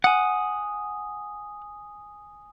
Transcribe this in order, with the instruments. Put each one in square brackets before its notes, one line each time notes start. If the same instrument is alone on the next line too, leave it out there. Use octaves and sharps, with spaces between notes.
[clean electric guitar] F#5 [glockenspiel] G#5 D#6